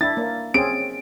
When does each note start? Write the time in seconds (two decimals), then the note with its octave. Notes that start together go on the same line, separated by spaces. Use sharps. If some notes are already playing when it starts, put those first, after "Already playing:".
0.01 D4 E4 A6
0.17 A#3
0.54 C4 C#4 G#4 D7